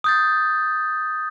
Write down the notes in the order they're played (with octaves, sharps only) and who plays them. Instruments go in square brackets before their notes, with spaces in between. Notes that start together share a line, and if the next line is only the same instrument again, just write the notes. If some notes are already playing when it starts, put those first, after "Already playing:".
[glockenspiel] D#6 G6 A6